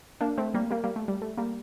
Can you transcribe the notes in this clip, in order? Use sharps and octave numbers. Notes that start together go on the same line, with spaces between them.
A#3 D4
A3 C4
G3 A#3
G3 A#3
G3 A#3
A3
G3
A3
G3 A#3